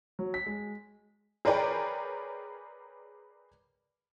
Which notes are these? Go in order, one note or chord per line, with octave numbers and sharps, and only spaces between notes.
F#3
B6
G#3
G#4 A#4 B4 C#5 D5 G5